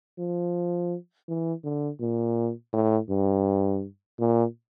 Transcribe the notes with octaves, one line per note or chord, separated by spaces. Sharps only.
F3
E3
D3
A#2
A2
G2
A#2